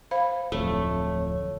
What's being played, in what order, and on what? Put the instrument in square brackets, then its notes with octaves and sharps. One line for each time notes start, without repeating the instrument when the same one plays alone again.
[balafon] C5 F5 B5
[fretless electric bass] D1 F2 [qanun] A3 [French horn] C#5